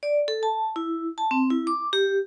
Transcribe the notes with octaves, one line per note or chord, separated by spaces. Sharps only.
D5
A4
A5
E4
A5
C4
E4
D6
G4